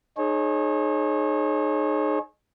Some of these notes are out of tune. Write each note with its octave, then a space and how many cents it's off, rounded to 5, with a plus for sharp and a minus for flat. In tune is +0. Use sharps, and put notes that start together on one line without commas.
D#4 -30 G#4 +25 C#5 -35